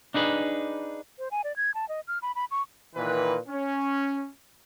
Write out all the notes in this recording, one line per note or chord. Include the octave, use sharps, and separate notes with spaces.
D4 D#4 G#4 B4
C5
G#5
D5
G#6
A5
D#5
F6
B5
B5
C#6
A#2 D#3 E3 B4
C#4